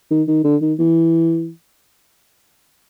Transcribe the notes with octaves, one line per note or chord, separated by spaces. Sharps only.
D#3
D#3
D3
D#3
E3